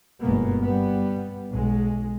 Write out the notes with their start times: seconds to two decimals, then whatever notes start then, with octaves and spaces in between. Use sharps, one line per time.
0.21 G1 F#2 B2 G#3 A#3 B3
0.64 G3 B3
1.52 B1 G#3